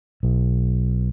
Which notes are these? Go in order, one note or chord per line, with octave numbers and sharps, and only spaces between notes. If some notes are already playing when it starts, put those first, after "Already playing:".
B1